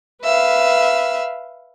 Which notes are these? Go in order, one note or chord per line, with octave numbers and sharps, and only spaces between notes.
B4 E5 F5